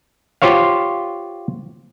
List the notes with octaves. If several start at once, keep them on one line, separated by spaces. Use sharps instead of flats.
F4 G4 C5 C#5 F5